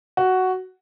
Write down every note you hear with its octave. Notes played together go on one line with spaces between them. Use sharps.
F#4